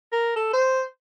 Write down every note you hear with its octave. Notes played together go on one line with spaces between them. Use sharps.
A#4
A4
C5